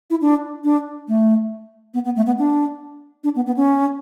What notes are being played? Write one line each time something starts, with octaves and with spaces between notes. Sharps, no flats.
E4
D4
D4
A3
B3
B3
A3
B3
D4
D4
B3
B3
C#4